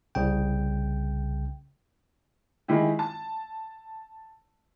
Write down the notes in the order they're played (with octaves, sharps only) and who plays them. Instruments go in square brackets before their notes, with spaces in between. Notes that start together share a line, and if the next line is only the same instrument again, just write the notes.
[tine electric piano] C2 C#3 G5
[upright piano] D#3 G#3 E4 G4
A5